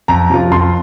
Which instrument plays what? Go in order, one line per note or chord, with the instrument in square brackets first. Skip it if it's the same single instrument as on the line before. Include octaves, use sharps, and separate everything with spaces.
[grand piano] F2 A#5
C3 F3 C4 F4
F2 C6